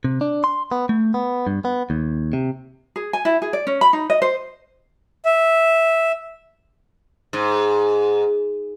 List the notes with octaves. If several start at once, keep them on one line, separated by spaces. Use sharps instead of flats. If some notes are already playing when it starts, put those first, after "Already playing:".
C3
D4
C6
B3
A3
B3
G2
B3
D#2
C3
G#4
G#5
E4
G#4
D5
C#4
B5
D#4
D#5
C5
E5
G#2